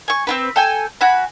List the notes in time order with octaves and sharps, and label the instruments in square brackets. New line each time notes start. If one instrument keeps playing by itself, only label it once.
[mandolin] G#5 C#6
C4 F4 B4
A4 G5 G#5
F#4 G#5 B5